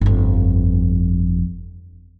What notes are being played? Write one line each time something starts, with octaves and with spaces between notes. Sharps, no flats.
G1 F2